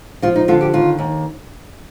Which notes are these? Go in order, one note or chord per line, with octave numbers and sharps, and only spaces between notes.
F3 F4
D#4
D3 F4
G4
D#2 F4
D#2